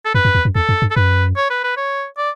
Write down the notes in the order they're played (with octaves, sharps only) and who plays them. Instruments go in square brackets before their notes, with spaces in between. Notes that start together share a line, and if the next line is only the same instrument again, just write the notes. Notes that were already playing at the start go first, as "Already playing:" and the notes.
[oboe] A4
[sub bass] F#2 [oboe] B4
[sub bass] F#2
E2
F#2
[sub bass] E2 [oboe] A4
[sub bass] F#2
G2
[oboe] A4
[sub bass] F#2 [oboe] B4
[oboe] C#5
B4
B4
C#5
D5